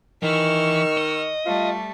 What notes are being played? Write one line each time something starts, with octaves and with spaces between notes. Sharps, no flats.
D#3 E3 C#6 E6 F6
D#5
G3 A3 F4